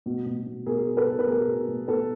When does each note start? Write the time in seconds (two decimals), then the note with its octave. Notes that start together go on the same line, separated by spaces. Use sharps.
0.06 B2
0.26 B2
0.46 B2
0.66 B2 G#4 A#4
0.87 B2
0.97 A4 B4
1.07 B2
1.19 B4
1.27 B2 G#4 A#4
1.47 B2
1.68 B2
1.88 B2 A4 B4